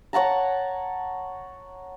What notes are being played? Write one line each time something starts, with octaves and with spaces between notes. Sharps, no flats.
C#5 F#5 A5 A#5